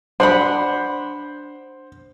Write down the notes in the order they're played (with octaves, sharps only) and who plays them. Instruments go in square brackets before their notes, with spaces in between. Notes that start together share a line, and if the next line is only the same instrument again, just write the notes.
[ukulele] D4 F#5 B5 [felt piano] C5